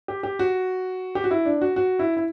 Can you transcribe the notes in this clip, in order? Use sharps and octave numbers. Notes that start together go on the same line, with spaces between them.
G4
G4
F#4
G4
F#4
E4
D4
F#4
F#4
E4
E4